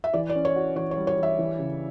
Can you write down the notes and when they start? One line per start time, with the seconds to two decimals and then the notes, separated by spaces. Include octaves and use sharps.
0.04 E5
0.13 E3 D5
0.29 D5
0.35 C#4
0.45 C#5
0.56 F#4
0.76 E3 C#5
0.91 C#5
0.96 G3
1.07 C#5
1.18 E3
1.23 E5
1.39 E3
1.59 C#3